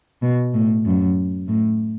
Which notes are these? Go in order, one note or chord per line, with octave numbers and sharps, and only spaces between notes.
B2
A2
F#2
A2